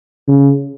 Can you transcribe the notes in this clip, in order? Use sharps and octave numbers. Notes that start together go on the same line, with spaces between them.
C#3